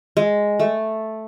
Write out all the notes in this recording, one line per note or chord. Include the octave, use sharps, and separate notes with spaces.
G#3
A3